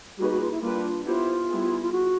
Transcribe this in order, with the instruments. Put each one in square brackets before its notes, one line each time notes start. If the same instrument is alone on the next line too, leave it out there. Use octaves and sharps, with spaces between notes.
[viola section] G3 A#3 D#4 G#4 B4 [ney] F#4
[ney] F#4
F4
E4
[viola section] G3 A#3 D4 G4 B4 [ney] F4
[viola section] B3 E4 G4 C5 [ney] F4
[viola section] G3 B3 E4 G#4
[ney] F4
F#4